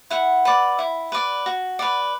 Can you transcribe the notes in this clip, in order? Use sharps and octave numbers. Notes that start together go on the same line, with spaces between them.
E4 F#5
B4 D5
E4
B4 D5
F#4
B4 D5